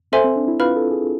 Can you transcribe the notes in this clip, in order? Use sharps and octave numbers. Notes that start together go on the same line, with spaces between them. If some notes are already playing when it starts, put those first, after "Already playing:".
C4 A4 C5 E5 G#5 C6
C4
D4
E4
F4 B4 F5 B5 F6
A4
G#4